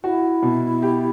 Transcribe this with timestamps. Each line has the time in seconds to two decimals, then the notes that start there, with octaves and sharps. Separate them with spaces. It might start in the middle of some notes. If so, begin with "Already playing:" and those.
0.04 E4 F#4
0.43 B2
0.82 G4